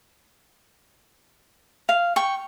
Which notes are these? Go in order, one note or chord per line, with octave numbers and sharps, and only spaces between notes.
F5
G5 C#6